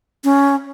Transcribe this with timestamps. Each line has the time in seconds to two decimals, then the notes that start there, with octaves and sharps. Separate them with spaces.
0.24 C#4